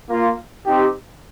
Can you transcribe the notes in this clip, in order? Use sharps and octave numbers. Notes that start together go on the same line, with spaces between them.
A#3 F4
C4 D#4 G4